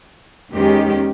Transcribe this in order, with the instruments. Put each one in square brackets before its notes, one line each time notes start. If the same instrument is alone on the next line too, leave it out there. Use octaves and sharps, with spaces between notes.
[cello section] E2 D#3 G#3 C#4 G4